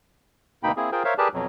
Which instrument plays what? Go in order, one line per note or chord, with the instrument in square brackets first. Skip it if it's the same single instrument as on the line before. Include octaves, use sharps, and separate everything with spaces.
[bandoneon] D2 B2 A#3 D#4 G5 B5
A#3 C4 E4 G#4
F4 G#4 A#4 C5 G5
A#4 C5 C#5 E5 F5
G4 G#4 A#4 B4 D5 A5
F2 B2 F#3